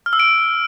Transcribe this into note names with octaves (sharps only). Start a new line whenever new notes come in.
F6
E6
D7